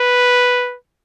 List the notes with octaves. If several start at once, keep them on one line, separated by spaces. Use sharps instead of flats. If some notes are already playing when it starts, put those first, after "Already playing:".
Already playing: B4